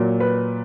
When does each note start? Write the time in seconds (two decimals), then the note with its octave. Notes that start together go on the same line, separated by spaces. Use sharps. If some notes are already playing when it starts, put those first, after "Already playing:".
Already playing: A#2 F#3
0.20 B4